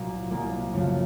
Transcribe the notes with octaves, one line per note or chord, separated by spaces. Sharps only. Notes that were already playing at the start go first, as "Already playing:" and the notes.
Already playing: C2 A#2 F#3 A#3
C2 A#2 F#3 A#3
F#2 C#3 F3 A3